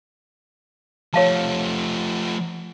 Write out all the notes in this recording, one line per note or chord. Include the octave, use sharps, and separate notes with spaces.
F3 A3 C#5 F5 A5